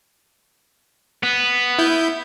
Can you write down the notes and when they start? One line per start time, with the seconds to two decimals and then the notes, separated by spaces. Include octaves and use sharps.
1.23 B3
1.79 E4 G6